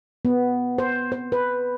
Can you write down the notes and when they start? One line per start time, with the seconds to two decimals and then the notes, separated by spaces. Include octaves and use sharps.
0.25 B3
0.78 C5
1.12 C5
1.32 B4